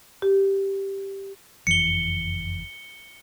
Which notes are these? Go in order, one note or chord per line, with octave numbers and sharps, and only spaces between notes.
G4
F#1 F2 E3 C#7 G7